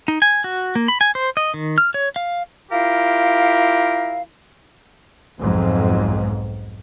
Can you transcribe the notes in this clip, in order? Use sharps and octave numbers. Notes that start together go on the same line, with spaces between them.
D#4
G#5
F#4
A#3
B5
G#5
C5
D#5
D#3
F6
C#5
F5
E4 F4 G4 A#4 F5
B1 F2 G#2